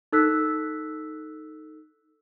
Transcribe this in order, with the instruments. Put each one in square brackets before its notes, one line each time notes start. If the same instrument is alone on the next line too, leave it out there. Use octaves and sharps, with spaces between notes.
[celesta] D#4 A4 E6 F#6 B6